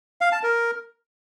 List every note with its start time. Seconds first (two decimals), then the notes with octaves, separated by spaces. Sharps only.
0.21 F5
0.32 A5
0.43 A#4